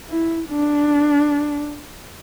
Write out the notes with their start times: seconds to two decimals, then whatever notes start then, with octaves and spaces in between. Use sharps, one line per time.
0.10 E4
0.49 D4